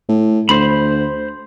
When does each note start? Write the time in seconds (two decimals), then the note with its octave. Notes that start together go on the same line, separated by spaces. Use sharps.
0.09 A2
0.49 D2 C5 B5